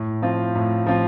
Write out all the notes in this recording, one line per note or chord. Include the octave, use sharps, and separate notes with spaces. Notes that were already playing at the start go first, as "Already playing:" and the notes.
Already playing: A2
F3 C4 F4
A2
F3 C4 F4